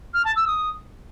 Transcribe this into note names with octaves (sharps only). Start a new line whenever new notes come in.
F6
A5
E6
D#6